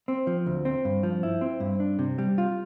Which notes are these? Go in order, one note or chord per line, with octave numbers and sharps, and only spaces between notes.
C4
F3
D2
C4
G2
F3
E4
C4
G2
D4
C3
G3
F4